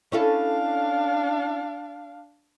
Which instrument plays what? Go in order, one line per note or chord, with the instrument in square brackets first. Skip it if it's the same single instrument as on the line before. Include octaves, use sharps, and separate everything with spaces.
[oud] C#4 E4 A4 [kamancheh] D4 F5